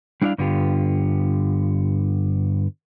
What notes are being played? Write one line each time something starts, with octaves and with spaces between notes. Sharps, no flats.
G3 D4 E4 C#5 D5 F5
G2 D3 B3 F4 G4